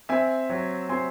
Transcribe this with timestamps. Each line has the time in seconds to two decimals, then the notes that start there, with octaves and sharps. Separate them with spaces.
0.09 C4 E5 G#5
0.49 F#3
0.89 C4 G#5 C6